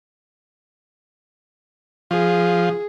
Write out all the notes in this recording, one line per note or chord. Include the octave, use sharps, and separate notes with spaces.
F3 G#4